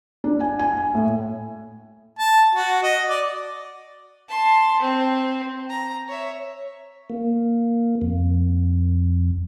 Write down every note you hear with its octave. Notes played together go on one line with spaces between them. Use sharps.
D4
G#5
G#5
G#5
A2
A5
F#4
D#5
D5
A5 C6
C4
A#5
C#5 E5
A#3
F2